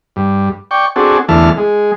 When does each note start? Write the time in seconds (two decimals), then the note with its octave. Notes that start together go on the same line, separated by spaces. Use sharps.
0.16 G2
0.71 D5 G5 C#6
0.96 C4 D4 F#4 G#4 A4
1.29 E2 D3 E3 A3 A5 F6
1.58 G#3